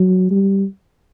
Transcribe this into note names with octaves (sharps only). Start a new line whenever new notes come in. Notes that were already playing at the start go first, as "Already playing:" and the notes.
Already playing: F#3
G3